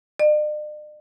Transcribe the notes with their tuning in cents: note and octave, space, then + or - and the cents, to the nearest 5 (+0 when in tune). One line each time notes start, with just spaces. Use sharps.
D5 +45